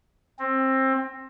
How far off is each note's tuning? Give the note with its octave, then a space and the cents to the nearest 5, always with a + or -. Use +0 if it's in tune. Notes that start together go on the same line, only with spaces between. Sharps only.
C4 +20